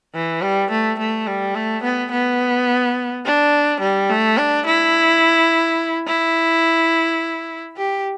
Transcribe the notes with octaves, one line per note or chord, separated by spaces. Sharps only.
E3
G3
A3
A3
G3
A3
B3
B3
D4
G3
A3
D4
E4
E4
G4